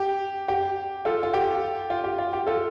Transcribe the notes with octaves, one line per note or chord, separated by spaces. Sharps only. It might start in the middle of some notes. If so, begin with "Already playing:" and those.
Already playing: G4
G4
F4 A4
F4
G4
F4
G4
F4
G4
F4 A4